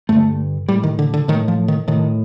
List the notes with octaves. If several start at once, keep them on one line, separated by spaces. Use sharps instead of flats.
G2 D3 A3
A2 G3
D#3
D3
D3
A2 D#3
F3
D#3
A2 D#3